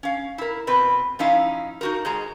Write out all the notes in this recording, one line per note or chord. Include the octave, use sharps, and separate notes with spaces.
C#4 F5
E4 A#4
B2 C4 B4
F3 C#4 D#4 E4 F5
D#4 F#4 A#4
G#2 G#3 A#5